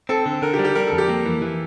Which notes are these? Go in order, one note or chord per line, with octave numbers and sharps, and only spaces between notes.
C4 A4
D3
D3 A#4
G4
G3
G4
G3 A#4
A4
F2
G4
A#3
E3
E3